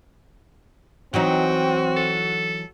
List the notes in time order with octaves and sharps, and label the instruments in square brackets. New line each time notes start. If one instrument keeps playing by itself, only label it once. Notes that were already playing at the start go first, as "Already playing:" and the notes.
[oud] E3 F#3 D#4 [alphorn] C4 [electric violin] F#4 [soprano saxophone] G5
[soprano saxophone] A4